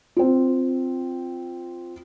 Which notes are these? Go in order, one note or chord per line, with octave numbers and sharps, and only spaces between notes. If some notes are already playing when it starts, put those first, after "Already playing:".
C4 F4